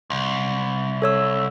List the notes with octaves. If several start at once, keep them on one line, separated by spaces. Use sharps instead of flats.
C2
A4 C#5 E6